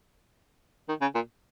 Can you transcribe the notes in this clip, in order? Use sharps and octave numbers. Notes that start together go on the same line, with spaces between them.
D#3
C#3
A#2